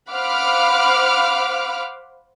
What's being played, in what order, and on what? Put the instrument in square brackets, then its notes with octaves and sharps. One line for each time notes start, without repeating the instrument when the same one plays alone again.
[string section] C5 F5 F#5 B5 D6 F6